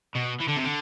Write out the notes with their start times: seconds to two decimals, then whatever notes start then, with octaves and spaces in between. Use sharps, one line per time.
0.16 B2
0.41 E3
0.48 D3
0.57 C3
0.64 D3